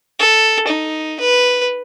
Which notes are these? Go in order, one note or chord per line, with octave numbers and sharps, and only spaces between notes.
A4
D#4
B4